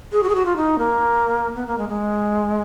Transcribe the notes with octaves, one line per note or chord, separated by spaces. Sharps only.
G#4
F#4
G#4
F#4
F4
D#4
A#3
B3
A#3
G#3
G#3